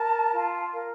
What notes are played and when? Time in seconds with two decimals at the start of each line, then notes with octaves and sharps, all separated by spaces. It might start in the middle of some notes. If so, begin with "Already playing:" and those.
Already playing: A#4 A5
0.32 F4
0.72 A#4